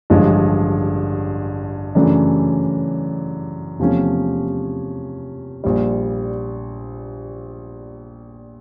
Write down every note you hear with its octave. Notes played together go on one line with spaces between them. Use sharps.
A1 G2 D3 F3 G#3
F#2 C#3 E3 A3 D4
E2 C3 F3 A3 C#4
A#1 A#2 G3